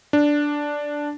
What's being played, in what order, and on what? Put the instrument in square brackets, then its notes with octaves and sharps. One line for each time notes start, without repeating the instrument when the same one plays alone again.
[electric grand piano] D4